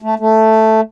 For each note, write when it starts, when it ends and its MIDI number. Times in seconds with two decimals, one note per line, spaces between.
0.02 0.15 57
0.19 0.81 57